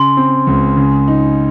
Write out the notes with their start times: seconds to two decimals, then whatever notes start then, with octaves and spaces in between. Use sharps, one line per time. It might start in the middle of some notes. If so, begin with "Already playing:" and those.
Already playing: C#3 C6
0.17 C4
0.47 C#2
0.77 C#3
1.08 D#4